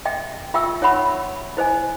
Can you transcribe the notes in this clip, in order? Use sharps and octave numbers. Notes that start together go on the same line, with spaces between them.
D#5 E5 G5
F4 E5 G5 C#6 E6
D#4 C#5 E5 F#5 B5 C#6
E4 C5 D#5 G#5